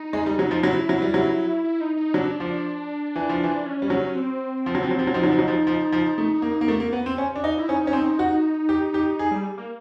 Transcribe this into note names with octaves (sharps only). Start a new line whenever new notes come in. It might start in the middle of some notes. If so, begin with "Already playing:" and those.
Already playing: D#4
G#3
G3
F#3
F3
F#3 E4
F#3
G3
F#3
E4
D#4
D#4
F#3 D4
F3
E3
F3
E3
C#4
G3
F#3
C#4
C4
F3
F#3
F3
F#3
F3
F#3
F3 D#4
F#3
F3
F#3
F3
F3
F3
A3 D#4
D#4
A#3
D#4
A#3
A3
A#3
B3
C4
C#4
D4
D#4
E4
C#4 D#4
C#4
C4
F#4
G4
G4
G#4
G3
A#3